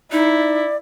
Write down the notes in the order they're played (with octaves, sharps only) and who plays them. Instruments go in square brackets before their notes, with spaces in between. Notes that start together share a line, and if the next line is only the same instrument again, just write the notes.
[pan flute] D#4 [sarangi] E4 [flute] D5